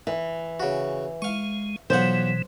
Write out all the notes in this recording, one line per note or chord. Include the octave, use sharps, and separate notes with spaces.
E3
C#3 F#4
G#3 F5 C#6
B1 B2 E3 F3 C5 F#5